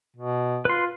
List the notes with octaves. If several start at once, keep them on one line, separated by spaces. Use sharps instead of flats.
B2
F4 B4 C6